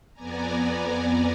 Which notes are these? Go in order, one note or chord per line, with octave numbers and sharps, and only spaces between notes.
F2 B3 D5 G#5 A#5